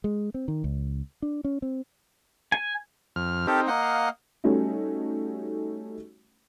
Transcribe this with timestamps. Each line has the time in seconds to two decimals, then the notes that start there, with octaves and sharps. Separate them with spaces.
0.04 G#3
0.34 C4
0.48 D#3
0.64 C#2
1.22 D4
1.44 C#4
1.62 C4
2.52 G#5
3.16 F2 F6
3.47 C4 D#4 G4 A4 A#4
3.67 A#3 D#5 F#5
3.82 F5
4.44 G3 A3 C#4 D#4 F#4